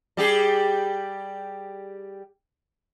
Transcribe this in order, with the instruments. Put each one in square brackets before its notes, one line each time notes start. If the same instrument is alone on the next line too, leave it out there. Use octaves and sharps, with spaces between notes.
[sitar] G3 G4 G#4